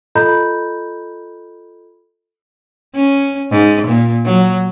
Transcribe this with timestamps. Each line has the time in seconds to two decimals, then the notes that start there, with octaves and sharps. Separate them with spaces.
0.15 F4 A4 D#5 A#5 B5 G6
2.95 C#4
3.51 G#2
3.87 A#2
4.25 F#3